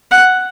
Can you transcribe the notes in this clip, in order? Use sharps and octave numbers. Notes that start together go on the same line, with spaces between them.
F#5